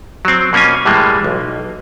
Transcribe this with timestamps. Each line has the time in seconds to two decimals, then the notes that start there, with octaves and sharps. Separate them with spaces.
0.25 F#3 C4
0.53 B2 A#3 C#4 F4 G#5
0.85 A2 E3 G3 G#3 A#3
1.24 B1